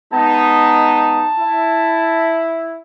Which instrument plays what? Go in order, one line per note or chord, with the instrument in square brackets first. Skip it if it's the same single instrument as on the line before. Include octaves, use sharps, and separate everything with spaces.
[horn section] G#3 B3 D#4 [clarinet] A5
[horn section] E4